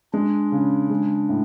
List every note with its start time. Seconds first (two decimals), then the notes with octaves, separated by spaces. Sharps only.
0.13 G#3 D4
0.52 C#3
0.90 G#3
1.29 A2